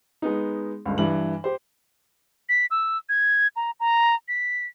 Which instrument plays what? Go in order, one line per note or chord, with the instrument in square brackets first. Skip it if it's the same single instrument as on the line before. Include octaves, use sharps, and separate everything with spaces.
[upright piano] G#3 B3 D#4
G1 C#2
G2 E3 F#7
G4 C5
[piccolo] B6
E6
G#6
A#5
A#5
B6